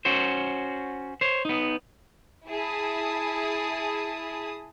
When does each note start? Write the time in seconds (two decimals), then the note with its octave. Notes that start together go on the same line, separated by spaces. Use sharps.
0.05 C#4 F#4 C5
1.21 C5 C#5
1.45 B3 D#4
2.47 E4 G#4 A5 D#6